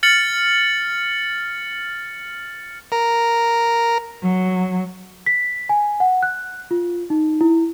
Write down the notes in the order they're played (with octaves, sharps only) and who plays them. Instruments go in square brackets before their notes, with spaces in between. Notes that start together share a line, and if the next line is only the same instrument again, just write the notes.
[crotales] F6 A6 C#7 F#7
[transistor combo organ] A#4
[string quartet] F#3
[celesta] B6
G#5
F#5
F#6
F4
D#4
E4